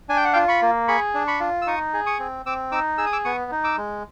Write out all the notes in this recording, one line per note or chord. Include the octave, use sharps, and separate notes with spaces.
D4 G#5
G5
F#5
F4 F5 G5
B5 C#6
A#3
G#4 B5 C#6
D4
B5 C#6
F4
E6
D#4 C#6 D#6
G#4
C#6 D#6
C4
C4 D6 E6
D#4 D6 E6
G#4 E6
D#6
D6 E6
B3 C#6 D#6
D#4
D6 E6
G#3